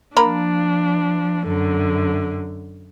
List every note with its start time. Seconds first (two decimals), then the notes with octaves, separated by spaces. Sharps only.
0.17 F3 A#3 D4 A#5 B5
1.48 F#2 D3